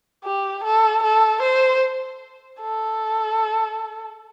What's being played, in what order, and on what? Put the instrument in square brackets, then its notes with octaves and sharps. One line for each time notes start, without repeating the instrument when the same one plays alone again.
[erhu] G4
A4
A4
C5
A4